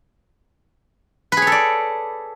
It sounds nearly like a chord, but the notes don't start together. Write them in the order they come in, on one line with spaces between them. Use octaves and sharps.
B4 G#4 C#5 A4 D5